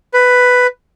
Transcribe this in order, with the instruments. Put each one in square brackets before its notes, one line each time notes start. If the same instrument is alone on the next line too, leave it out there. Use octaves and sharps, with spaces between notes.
[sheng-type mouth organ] B4